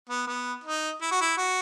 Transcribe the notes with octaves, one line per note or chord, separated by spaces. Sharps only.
B3
B3
D#4
E4
F#4
E4
F#4